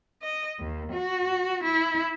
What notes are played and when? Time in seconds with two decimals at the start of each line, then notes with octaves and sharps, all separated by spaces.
0.21 D#5
0.59 D#2
0.92 F#4
1.64 E4